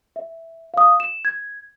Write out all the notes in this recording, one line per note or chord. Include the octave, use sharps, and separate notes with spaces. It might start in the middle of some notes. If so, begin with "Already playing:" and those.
E5
F5 D#6
E7
G#6